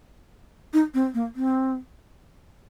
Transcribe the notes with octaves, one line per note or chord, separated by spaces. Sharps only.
D#4
C4
A#3
C4